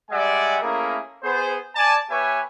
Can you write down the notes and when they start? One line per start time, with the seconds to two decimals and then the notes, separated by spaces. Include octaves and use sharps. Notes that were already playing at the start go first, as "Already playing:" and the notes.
0.10 G3 G#3 D5 E5 F#5 G#5
0.61 A3 A#3 C#4 E4 G#4 A#4
1.23 B3 G#4 C5
1.75 D5 G#5 A5
2.10 B3 G4 B4 C#5 E5 G#5